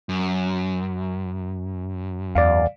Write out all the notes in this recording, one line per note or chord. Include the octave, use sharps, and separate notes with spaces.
F#2
E2 D5 F5